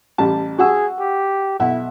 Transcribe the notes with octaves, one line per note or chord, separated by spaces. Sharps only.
A1 G3 A5
F#4 G#4 F#5 E6
G4
B1 E4 E5 F#5